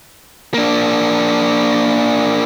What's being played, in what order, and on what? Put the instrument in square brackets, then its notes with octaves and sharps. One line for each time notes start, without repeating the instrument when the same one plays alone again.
[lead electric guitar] A#3 D4